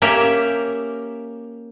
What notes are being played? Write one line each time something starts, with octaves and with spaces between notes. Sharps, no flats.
A#3 C#4 G4 A#4 E5